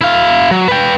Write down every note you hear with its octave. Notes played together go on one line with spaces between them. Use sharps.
E4 F5
F#3
B4 G5